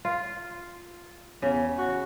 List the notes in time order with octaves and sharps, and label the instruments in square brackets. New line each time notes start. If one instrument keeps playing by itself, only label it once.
[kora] F4
[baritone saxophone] E2 [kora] C#3
[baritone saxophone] F#4